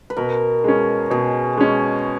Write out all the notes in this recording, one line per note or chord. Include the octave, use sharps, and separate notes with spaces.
B4
B2 A#4
G#3 C#4
B2 G#4
G#3 C#4